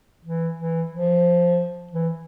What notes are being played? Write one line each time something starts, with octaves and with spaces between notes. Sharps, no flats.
E3
E3
F3
E3